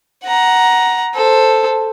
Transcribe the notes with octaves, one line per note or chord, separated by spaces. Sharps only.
F#5 A#5
A4 C5